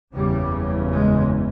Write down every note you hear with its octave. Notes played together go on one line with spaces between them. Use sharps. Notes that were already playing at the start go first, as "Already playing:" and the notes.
F#1 E2 C#3 G3
G#3